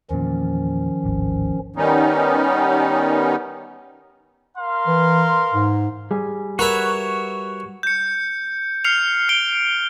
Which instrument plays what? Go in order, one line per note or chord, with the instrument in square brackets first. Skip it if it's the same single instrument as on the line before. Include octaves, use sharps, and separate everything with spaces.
[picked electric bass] E2 A#2 [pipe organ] D#3 F3 C#4
[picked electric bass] D1 G#1
[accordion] D#3 G3 B3 C#4 D#4
[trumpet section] A#4 F5 C6
[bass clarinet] E3
G#2
[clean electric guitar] G3 G#4 G#5
[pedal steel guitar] F#4 C#5 [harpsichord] A#4 B4 E5
[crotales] G6 C#7
F6 C7 C#7 F7
F6 D7 G7